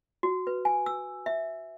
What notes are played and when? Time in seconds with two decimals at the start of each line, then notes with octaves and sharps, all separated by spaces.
0.23 F#4
0.47 B4
0.65 G#5
0.86 E6
1.26 E5